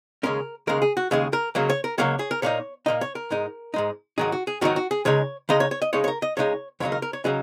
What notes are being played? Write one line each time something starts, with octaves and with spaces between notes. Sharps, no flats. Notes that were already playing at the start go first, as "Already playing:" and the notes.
D#2 C#3 G#3 C#4 A#4
D#2 C#3 G#3 A#4
G#4
F#4
D#2 C#3 G#3 G#4
A#4
C#2 C#3 F#3 A#3
C#5
A#4
C#2 C#3 F#3 A#3 C#5
G#4
A#4
A#2 A#3 D#4 C#5
A#2 A#3 D#4 D#5
C#5
A#4
G#2 G#3 D#4
G#2 G#3 D#4
G#2 D#3 F#3 D#4 G#4
F#4
G#4
G#2 D#3 F#3 D#4 F#4
F#4
G#4
C#2 C#3 G#3 D#4 C#5
C#2 C#3 G#3 D#4 D#5
C#5
C#5
D#5
C#2 C#3 G#3 D#4 C#5
C#5
A#4
D#5
C#2 C#3 G#3 D#4 C#5
D#2 C#3 F#3 D#4 C#5
A#4
A#4
C#5
C#3 F#3 D#4 G#4